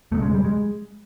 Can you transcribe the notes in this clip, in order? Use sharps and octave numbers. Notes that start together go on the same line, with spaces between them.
E1 D2 C#3 A3
G#3
G3
G#3